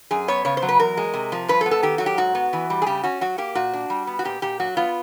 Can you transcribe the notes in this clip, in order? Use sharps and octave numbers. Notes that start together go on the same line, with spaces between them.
F#2 G#4
B3 C#5
C#3 C#5
C5
F#3
B4
E2 A#4
G#3
C3
F3
G2 B4
A4
B3
A4
D#3 G4
F#3 F#4
G4
G#2 F#4
B3
E3
G3
G#4
C#3 G4
C#4 F#4
F#3 F#4
A#3 G4
A#2 F#4
D4
G3
B3
F#4
A#2 G4
A#2 G4
F#3 F#4
B3 F4